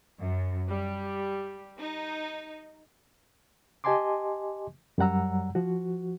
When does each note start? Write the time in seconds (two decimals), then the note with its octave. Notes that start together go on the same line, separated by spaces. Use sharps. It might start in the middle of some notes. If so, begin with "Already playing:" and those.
0.20 F#2
0.68 G3
1.78 D#4
3.84 G4 D#5 G#5 A5 C6 D6
4.98 F#2 F#3 G3 F#5 A#5 E6
5.55 F3 F#4